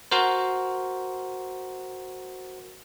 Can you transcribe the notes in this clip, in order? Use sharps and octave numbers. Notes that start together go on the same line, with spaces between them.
F#4 A#4 C5